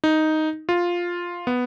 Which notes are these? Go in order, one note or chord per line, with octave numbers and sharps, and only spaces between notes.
D#4
F4
B3